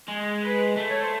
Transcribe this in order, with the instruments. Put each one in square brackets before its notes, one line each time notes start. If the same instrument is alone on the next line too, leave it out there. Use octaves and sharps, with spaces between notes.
[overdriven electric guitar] G#3
[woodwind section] B4
[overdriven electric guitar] A3
[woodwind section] C#5
C5